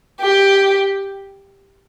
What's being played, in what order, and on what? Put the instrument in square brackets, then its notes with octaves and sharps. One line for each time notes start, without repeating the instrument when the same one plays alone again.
[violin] G4